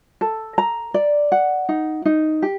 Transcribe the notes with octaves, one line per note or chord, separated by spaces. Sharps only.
A4
A#5
D5
F#5
D#4
D#4
G4